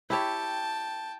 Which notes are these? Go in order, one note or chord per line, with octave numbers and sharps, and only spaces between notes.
E4 G4 C#5 G5 A5